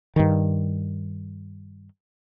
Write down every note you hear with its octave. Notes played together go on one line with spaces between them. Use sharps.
G2 D#3